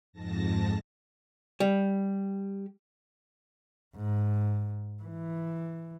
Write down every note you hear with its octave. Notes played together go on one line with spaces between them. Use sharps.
F2 G#2 A5 A#6
G3
G#2
E3